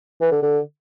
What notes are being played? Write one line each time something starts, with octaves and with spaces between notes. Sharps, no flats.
E3
D3
D3